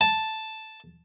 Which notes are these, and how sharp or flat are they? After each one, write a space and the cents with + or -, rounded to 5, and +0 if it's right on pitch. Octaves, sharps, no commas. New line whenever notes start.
A5 -5